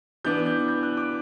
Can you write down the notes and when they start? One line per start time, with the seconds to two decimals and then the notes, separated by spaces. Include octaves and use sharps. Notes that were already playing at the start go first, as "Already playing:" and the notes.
0.24 E3 B3 D4 G6
0.46 G6
0.68 G6
0.83 F#6
0.97 D6